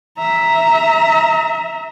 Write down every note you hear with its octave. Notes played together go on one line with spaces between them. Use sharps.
E5 A#5